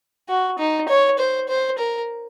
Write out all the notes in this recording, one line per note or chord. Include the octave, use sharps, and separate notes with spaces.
F#4
D#4
C#5
C5
C5
A#4